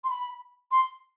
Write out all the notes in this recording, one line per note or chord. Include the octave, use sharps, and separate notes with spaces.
C6
B5
C6